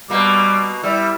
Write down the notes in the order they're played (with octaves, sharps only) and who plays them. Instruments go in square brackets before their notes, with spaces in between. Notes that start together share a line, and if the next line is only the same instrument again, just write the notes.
[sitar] B2 A#3 [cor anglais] G3
[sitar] G3 [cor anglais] E4